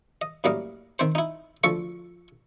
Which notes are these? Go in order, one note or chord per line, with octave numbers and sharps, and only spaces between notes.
D#5
F#2 A2 G3 A#3 D#5 F5
D#3 C4 C5
D#4 E4
D2 F3 A4 C#6